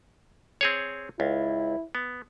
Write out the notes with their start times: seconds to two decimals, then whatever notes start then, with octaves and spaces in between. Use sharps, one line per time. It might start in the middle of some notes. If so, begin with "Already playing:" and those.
0.61 C4 G#4 C#5
1.20 C#2 E4
1.95 B3